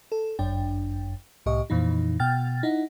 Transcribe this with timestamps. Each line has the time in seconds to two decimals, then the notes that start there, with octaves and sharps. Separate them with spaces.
0.12 A4
0.39 G1 F#2 D4 G5
1.46 C2 A2 G4 D#5 C#6
1.70 F2 A#2 E3 D#4
2.20 B2 G5 F6 A6
2.63 D#4 E4 F#5